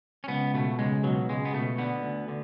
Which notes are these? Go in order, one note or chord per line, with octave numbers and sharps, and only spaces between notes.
C#4
C#2 B3
B2 A3
C#2 G#3
B2 F#3
C#2 G#3
B3
B2 A3
D3 B3
D2
D3